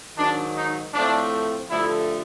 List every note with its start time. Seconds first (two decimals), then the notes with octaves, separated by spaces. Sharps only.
0.17 G#2 D#3 F#3 D4
0.57 D#4
0.94 A2 F3 A3 C4 D4
1.71 G2 D3 F3 A3 E4